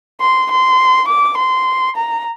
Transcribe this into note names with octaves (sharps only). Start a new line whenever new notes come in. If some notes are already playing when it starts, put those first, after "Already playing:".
C6
C6
D6
C6
A#5